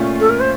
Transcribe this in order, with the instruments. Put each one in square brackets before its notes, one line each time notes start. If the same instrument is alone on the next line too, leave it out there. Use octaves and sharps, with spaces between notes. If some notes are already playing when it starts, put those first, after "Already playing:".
Already playing: [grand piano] A#2 A3 C#4 F4
[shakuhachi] A4
A#4
C5